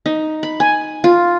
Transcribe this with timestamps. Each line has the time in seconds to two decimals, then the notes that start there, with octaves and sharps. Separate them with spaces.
0.06 D#4
0.43 B5
0.60 G#5
1.04 F4